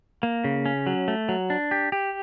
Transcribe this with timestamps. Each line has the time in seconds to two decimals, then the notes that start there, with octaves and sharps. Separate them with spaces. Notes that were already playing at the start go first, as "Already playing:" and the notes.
0.23 A#3
0.44 C#3
0.66 C#4
0.87 F#3
1.08 A3
1.29 F#3
1.50 D4
1.71 G4
1.92 G4